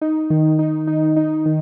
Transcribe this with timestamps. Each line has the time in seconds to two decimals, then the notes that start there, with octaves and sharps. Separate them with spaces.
0.01 D#4
0.30 D#3
0.59 D#4
0.87 D#4
1.16 D#4
1.46 D#3